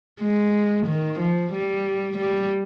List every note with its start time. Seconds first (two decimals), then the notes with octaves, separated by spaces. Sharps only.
0.21 G#3
0.87 D#3
1.20 F3
1.53 G3
2.18 G3